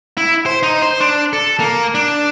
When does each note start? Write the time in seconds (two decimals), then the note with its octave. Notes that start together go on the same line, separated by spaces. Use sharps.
0.17 E4
0.46 C5
0.63 D#4
0.82 C5
1.00 D4
1.33 A4
1.60 A#3
1.95 D4